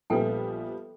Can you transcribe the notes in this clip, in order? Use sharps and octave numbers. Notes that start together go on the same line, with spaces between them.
A#1 F3 G3 B3 A4 G5 A5